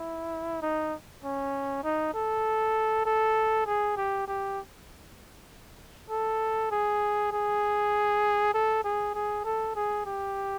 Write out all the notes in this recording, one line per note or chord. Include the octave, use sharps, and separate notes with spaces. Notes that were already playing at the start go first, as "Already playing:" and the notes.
Already playing: E4
D#4
C#4
D#4
A4
A4
G#4
G4
G4
A4
G#4
G#4
A4
G#4
G#4
A4
G#4
G4